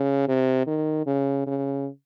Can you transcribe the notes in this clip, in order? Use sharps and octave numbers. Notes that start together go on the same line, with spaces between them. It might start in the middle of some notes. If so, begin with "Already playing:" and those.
Already playing: C#3
C3
D#3
C#3
C#3